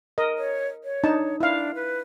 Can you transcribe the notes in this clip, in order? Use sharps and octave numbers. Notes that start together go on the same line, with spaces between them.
A#4 D#5
C#5
C#5
D4 D#4 A5
D4 E4 F5
B4